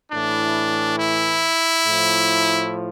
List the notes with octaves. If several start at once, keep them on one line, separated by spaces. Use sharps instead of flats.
A2 E3 D4
E4
A2 F3